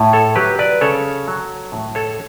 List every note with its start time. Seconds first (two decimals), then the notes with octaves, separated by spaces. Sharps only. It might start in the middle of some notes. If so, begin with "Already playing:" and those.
Already playing: A2
0.13 A4 C#5
0.35 F#3 G4 B4
0.59 B4 D5
0.81 C#3 A4 C#5
1.28 F#3
1.72 A2
1.95 A4 C#5